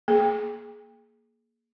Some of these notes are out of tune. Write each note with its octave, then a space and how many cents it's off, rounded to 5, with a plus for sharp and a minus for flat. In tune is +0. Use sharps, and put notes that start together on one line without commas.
A#3 +0 G#4 +20